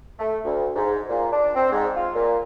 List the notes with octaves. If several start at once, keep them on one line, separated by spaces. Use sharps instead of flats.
A3
D2
G#2
A#2
D4
C4
G#2
F4
A#2